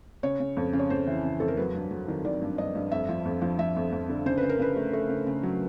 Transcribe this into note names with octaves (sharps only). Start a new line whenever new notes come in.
C#3 C#5
C#3
F2
C#3
C#5
F2 C5
E3
C#3
F2 A4
A#4
F#3 B4
G2
F#3
D#3
D#3 D5
G2
G2 D#5
G2
F2 E5
F3
F2
F3
F3 E5
F2
F2
D3
C#3 C5
B4
C#3
A#4
C#3 B4
A3
A3
C#3
C#3
F#3